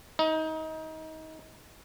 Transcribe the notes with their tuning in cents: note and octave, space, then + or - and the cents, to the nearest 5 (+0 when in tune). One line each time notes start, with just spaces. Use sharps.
D#4 +25